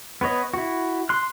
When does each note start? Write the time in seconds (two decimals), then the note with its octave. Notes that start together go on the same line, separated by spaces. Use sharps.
0.21 B3 B4 C#5 D#5
0.54 E4 F#4
1.09 C6 F#6